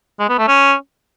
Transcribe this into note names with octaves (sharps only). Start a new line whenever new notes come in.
G#3
B3
A3
C#4